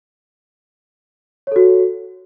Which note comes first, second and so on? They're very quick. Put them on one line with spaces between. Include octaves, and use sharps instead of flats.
C#5 A4 F#4